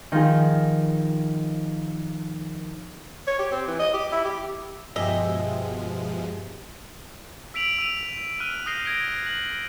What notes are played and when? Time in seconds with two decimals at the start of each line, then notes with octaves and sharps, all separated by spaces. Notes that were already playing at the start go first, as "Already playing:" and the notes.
0.12 D#3 F3 G#4
3.27 C#5
3.39 G4
3.52 C4
3.67 E3
3.79 D#5
3.94 G4
4.12 E4
4.25 G4
4.96 G2 B2 F3 G#3 G4 G#4 D#5 E5
7.54 E6 B6 D7 F7 F#7
7.78 E6 D#7 F7
8.40 F6 F#6 D7 D#7
8.66 D#6 F6 G6 A#6 C7 G7
8.85 G#6 A#6 D7 G7
9.25 F#6 A#6 F#7